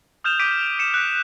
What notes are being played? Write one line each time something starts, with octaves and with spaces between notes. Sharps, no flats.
D#6 F6 G6 E7 F7
D6 G6 B6 D7 D#7
F7
C#7 E7
F#6 B6